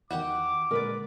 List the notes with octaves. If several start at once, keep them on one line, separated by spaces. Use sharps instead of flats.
E2 D#3 F#4 G4 F#5 D6
A#2 D3 G#3 A#4 B4 D5